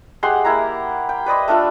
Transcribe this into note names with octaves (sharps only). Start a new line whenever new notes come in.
G#3 G4 F#5 C6
A#3 E4 A#5
G5
B4 D5 D#5 C6
A3 D4 F4 A4